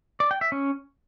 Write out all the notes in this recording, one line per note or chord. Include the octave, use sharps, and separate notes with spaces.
D5
G5
E5
C#4